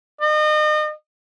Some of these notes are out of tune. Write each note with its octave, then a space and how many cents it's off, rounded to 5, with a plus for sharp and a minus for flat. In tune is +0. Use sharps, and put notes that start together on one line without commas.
D#5 -35